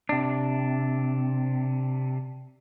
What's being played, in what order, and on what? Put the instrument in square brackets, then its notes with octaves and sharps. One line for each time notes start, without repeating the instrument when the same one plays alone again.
[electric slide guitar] C3 D4